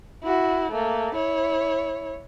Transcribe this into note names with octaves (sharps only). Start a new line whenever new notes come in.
E4 F#4
A3 A#3
E4 C#5